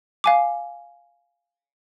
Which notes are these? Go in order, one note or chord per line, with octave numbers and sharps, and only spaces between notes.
F5 G#5 D6